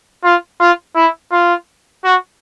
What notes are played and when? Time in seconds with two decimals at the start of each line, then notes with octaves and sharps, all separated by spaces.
0.24 F4
0.60 F4
0.96 E4
1.32 F4
2.04 F#4